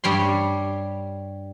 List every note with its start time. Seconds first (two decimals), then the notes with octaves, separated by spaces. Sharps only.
0.04 G2 G3 C#5 C6